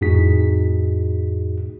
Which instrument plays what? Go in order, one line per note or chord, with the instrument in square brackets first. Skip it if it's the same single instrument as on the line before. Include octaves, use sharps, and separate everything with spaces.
[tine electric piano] F2 A2 D#4 F#4 G#4 B6